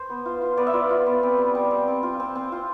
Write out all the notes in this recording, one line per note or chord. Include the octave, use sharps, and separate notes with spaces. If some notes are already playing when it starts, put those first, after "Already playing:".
Already playing: C5
B3
F4
F4
B3 D5
E5
F4 D5
F4
B3
C4
G3
G3
C4
C4
F4
C4
C4
F4